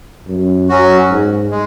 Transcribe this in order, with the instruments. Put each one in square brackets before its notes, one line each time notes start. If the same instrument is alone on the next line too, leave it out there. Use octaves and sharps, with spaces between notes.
[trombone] F#2
[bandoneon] F#3 C#4 F#4
[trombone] G#2
[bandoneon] G#3